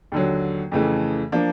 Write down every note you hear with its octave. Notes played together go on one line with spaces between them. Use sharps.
D#2 D3 F#3
F2 C#3 E3 A3
F3 A#3 D4